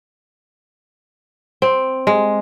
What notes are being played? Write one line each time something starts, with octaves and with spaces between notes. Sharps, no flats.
C4
G#3